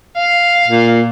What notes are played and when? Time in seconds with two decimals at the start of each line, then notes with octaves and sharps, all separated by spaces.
0.17 F5
0.68 A#2